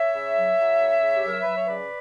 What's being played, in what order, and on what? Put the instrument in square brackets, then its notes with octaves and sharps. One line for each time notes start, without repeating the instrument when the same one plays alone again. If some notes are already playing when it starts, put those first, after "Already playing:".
Already playing: [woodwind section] C#5 E5
C#3
F#3
F#3
C#3
C#3
G4
F#3 A#4
F#3 B4
C#5
C#3 B4 D5